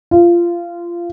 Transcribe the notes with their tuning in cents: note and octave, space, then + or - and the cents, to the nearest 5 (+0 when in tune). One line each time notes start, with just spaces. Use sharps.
F4 -20